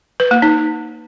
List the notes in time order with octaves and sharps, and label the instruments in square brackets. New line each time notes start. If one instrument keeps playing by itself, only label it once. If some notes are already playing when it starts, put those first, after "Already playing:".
[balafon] B4
A#3
D#4